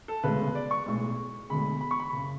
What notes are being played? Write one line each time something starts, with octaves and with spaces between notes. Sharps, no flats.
A4
E1 D2 C#3 G#3 B4
D5
C#6
B1 A2 G#3
E1 D2 D3 G#3 B5
B5
C#6
B5
F#1 C#3